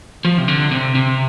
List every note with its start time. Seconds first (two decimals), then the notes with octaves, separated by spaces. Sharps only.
0.25 F3
0.38 C3
0.48 D3
0.71 C3
0.95 C3